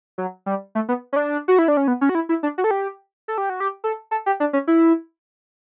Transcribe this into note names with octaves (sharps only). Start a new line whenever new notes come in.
F#3
G3
A3
B3
C#4
D4
F#4
E4
D4
C#4
B3
C#4
F#4
E4
E4
D4
F#4
A4
G4
A4
G4
F#4
G4
A4
A4
G4
D4
C#4
E4